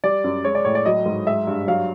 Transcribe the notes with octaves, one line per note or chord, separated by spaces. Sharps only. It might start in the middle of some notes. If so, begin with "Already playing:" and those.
G3 D5
F#2
G#3 C#5
D5
A2 C#5
D5
F#3 D#5
G#2
G#3 E5
G2
F#3 F5